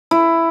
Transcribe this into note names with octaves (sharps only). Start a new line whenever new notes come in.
E4